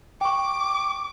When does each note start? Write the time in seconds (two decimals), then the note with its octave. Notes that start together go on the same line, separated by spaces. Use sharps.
0.21 G5 C#6 D6